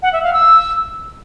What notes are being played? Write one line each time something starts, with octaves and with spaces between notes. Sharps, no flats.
F#5
E5
F5
E6